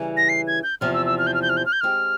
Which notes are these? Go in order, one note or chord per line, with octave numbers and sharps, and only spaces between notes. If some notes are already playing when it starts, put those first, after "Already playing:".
Already playing: C#3 E3 G3 C#4
A#6
C7
G#6
G6
E2 C3 F3 F6
E6
E6
F6
G6
F6
G6
F6
G6
F6
G6
G#3 C4 G4 F6